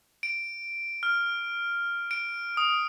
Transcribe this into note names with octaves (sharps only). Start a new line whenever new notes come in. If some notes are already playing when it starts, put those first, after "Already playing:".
D7
F6
D7
D#6